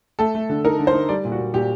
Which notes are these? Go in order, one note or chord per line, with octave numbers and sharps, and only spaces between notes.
A3 A4
A3
D3
D#4 A#4
D3
C5
D#4
G3 D5
A#2
F#4
A#2
A#2 G4